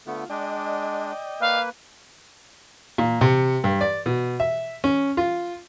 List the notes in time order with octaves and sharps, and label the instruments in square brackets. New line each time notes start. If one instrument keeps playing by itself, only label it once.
[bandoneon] D3 A3 B3 [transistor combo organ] F4
[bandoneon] G#3 D4 [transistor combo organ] D5 D#5 G5
[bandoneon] A#3 B4 [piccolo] F5
[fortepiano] A#2
C3
G2
D5
B2
E5
C#4
F4